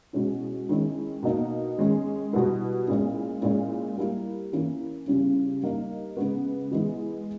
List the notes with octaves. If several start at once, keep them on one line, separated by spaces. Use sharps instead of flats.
B2 G#3 C#4 E4
D#3 G#3 C#4 E4
B2 A#3 D#4
D#3 G#3 C#4
B2 G3 B3 E4
A#2 G#3 C#4 E4
A#2 G#3 C#4 E4
G3 A#3 E4
E3 A#3 C#4 E4
C#3 G3 C#4 E4
G3 A#3 D#4
C#3 G#3 B3
E3 G#3 B3 E4